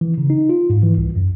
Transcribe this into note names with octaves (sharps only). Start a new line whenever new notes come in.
E3
C#3
D#4
F4
G#2
E3
C2
F#2